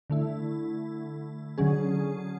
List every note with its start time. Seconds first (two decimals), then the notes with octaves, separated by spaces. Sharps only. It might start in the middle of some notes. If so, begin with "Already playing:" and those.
0.10 D3 A3 E4
1.58 D3 F#3 C#4 G#4